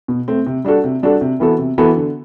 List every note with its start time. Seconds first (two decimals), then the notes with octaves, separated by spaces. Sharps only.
0.08 B2
0.28 A3 C4
0.47 C3
0.65 G3 D4 F#4 A4
0.84 C3
1.03 G3 D4 F#4 A4
1.21 C3
1.40 E3 B3 F#4 A4
1.59 C3
1.78 E3 B3 F#4 A4
1.96 D3